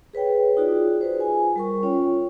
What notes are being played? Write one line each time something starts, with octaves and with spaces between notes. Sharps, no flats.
G#4 B4 C#5 G5
D#4 F4 F#4 G#4 D5
G#4 B4 C5
F4 G#5
G3 A#4 C#6
C#4 F4 C#5 G5